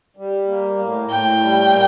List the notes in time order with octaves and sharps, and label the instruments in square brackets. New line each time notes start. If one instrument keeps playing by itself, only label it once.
[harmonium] G3
A#3
A2
[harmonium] A2 [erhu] G5
[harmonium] G3
A#3